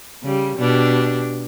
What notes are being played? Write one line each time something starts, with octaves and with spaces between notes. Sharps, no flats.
C#3 G3
B2 D4 G4